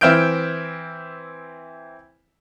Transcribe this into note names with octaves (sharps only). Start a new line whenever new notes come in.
E3 C4 E5 F6 G6 D7